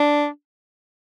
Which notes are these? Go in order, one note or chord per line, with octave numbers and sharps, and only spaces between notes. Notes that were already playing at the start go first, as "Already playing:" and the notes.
Already playing: D4